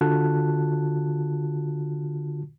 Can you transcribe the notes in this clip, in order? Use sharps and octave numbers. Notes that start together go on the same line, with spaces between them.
D3 F4 F#4 A5 F#6